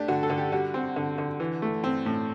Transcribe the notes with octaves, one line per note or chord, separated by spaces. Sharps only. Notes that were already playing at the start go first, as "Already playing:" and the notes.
Already playing: A3 D4 G4
D3 F#4
A4
D3
G4
G3 F#4
C4
D3
D3
E3
A3
C4
A2